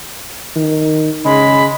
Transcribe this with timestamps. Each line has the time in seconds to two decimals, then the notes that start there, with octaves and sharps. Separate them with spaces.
0.56 D#3
1.25 C#3 G#3 B5